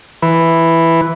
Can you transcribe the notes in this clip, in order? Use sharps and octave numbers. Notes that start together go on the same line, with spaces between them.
E3 B4